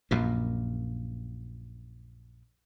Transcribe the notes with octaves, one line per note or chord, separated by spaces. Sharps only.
A#1 F#2 A#2